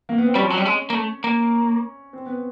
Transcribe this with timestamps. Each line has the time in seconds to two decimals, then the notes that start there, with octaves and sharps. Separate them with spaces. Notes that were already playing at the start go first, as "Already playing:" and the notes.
0.09 A#3
0.18 B3
0.26 C4
0.35 G3 C#4
0.43 F3
0.50 F#3
0.58 G3
0.65 G#3
0.90 A#3
0.95 A3
1.24 A#3
2.13 C4
2.26 B3